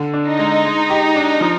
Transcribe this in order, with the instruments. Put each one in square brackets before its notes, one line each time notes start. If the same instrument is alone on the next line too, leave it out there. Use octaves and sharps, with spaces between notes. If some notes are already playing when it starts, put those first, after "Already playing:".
Already playing: [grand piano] D3
D4
[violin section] D#4
[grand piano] G#3
G#3
G4
D4
F3